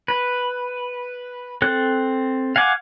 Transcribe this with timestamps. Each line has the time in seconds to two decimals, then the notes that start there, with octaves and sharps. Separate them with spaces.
0.08 B4
1.62 C4 A4 F#6
2.56 F5 F#5 G#5 D6